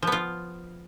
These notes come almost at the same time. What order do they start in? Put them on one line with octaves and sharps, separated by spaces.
F3 B3 F4